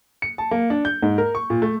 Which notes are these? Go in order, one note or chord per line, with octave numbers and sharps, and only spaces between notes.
C#7
A5
A#3
D4
G6
G#2
A#4
C#6
A#2
A3